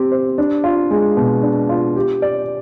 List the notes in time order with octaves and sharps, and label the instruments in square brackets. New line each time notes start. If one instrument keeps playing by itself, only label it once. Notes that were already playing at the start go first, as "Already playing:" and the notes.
Already playing: [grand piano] C4 G4
C5
D4
F4
G#3
B2
D4
F4
G4
D5